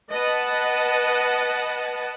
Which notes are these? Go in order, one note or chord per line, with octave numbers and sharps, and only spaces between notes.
B4 D#5 F#5 A5